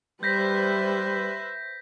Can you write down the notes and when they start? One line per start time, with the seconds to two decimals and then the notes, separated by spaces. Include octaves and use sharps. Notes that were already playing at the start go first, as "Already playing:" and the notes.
0.23 G3 B4 C5 E5 G6 A#6 B6